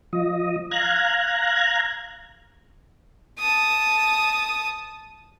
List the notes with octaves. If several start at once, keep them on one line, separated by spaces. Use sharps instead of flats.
F3 D#5
F5 A#5 F#6 G#6
A5 D#6